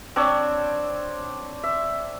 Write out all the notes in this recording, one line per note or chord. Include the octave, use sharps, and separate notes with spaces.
C4 D4 C#5
E5